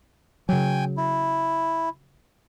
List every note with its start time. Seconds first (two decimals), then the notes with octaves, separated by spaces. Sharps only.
0.49 C#3 F#3 G5 G#5
0.97 E4